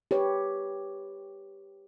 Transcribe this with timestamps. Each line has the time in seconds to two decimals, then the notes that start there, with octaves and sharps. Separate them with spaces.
0.11 G4 B4 C#5